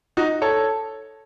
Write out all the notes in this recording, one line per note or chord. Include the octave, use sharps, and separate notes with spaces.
D#4 F#4
A4 C#5